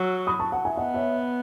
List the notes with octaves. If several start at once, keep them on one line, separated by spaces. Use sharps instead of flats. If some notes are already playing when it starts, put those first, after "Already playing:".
Already playing: F#3 C#6 E6
B5 D#6
A5 C#6
F#5 A5
E5 G#5
B3 D#5 F#5
C#5 E5